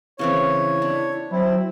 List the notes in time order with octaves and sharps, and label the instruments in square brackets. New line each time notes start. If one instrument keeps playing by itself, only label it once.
[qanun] C#3 E3 C4 [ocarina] E4 [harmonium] C#5
[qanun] D4
[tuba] F#3 [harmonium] C4 E4